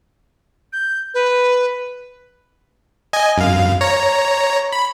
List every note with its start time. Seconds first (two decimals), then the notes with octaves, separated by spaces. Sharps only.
0.73 G6
1.14 B4
3.13 D#5 G#5
3.38 F#2 F5
3.81 C#5 A#5
4.72 B5